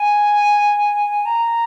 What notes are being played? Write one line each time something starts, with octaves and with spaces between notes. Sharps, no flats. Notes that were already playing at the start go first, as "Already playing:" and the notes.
Already playing: G#5
A#5